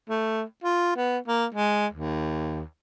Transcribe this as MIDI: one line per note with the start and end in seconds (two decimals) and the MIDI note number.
0.09 0.42 57
0.64 0.92 65
0.96 1.18 59
1.28 1.46 58
1.54 1.87 56
1.93 2.62 39